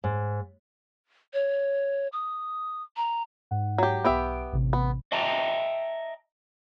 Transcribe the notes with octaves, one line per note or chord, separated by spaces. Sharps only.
G#2
C#5
D#6
A#5
G#2 F#5
F#3 G4
B1 B3 G4 E5 D7
A1 C3
B3
D#5 E5 G5 A5 A#5